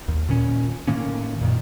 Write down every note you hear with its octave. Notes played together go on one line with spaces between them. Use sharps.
D#2
A#2 D#3 C#4
A2 D#3 A#3 C#4
F#2 A#2 D#3